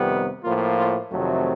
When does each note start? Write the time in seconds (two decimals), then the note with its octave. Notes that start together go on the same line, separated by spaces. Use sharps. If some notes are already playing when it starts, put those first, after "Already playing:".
Already playing: F2 C3 D#3 G3 B3
0.43 A2 F3 A#3 F4
0.77 F4
1.12 F2 C3 D#3 F#3 A3